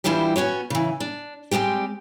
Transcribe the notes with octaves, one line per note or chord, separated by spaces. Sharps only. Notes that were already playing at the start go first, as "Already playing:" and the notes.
E3 G3 D4 E4 F4 G4
B3 C#4 F#4 C#5
C#3 E3
D4
G3 G#3 C4 F4 G4